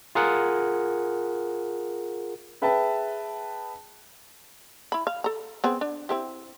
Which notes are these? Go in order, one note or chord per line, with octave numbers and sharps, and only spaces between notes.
F4 G#4 A#4 F#5
G#4 B4 E5 G5 A5
E4 B5
F5
A4 A#5
B3 C4 G#4
D4
C4 E4 G4